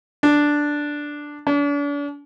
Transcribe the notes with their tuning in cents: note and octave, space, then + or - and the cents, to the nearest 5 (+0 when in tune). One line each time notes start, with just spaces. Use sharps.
D4 +0
D4 -40